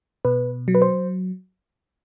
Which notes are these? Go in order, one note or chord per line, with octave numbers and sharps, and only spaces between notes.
B2 B4
F#3
B4
C5